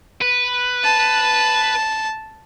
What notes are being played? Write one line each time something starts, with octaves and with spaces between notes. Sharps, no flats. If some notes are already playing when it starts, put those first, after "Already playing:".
B4
A5